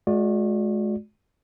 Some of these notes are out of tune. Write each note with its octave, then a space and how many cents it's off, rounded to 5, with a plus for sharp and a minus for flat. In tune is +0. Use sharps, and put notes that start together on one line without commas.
G#3 +35 F#4 -35 D5 +0